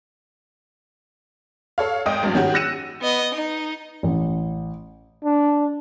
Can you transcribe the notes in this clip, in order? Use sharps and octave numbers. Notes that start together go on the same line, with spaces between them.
A4 C#5 F5
G#1 D#5 G5 D#6
G#1 G2 F#3
D#3 C#4 F#4 G4
E6 F#6 A#6 C#7 D#7 E7
B3 D#5
D#4
A1
D4